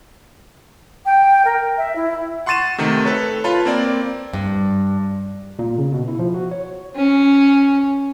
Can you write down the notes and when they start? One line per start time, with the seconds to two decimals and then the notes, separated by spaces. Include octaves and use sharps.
1.05 G5
1.45 A#4
1.78 E5
1.96 E4
2.46 F#5 C6 C#6 A6 D#7 E7
2.78 C3 D#3 A3
3.05 A4 B4 C#5
3.44 F4 B4 C#5 A5 B5
3.65 A#3 C4 D5
4.33 G2
5.59 A#2
5.78 C#3
5.92 B2
6.08 E4
6.19 F3
6.34 F#4
6.51 C#5
6.96 C#4